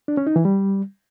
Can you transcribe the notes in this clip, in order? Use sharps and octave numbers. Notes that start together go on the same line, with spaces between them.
D4
C#4
D#4
E3
G3